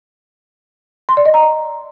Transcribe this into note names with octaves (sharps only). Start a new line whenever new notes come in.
C6
D5
D#5
A#5